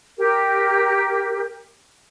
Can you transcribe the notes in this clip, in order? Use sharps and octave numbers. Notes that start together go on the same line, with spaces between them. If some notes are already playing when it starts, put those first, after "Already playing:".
G4 A#4